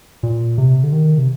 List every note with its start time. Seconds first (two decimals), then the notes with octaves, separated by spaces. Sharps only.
0.23 A#2
0.58 C3
0.83 D3
0.92 D#3
1.18 C3